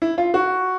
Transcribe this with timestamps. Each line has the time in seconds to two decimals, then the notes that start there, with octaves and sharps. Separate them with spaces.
0.02 E4
0.18 F4
0.34 F#4